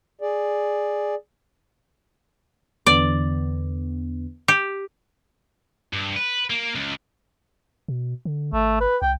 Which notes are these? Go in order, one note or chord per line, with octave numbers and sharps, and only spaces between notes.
G#4 D5
E2 D3 B3 D5
G4
G2
B4
A#3
C#2
B2
D3
G#1 A3
B4
C2 G5